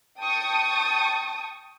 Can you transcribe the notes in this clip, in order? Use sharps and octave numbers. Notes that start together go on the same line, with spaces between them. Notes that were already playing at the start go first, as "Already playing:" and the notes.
G5 A5 C#6 D#6